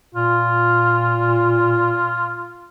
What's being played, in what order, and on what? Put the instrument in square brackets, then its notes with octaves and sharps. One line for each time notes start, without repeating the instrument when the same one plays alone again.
[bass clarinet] A#2 [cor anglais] F4